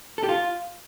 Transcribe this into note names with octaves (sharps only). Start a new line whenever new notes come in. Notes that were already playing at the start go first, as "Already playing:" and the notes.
A4
G4
F4